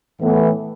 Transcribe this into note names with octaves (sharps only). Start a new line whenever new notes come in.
A2 E3 B3